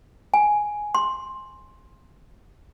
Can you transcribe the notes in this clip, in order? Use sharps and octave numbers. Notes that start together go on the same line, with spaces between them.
G#5
C6